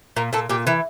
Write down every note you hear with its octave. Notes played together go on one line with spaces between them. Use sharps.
A#2 A#4
A#2 A4
A#2 G4
E3 A#4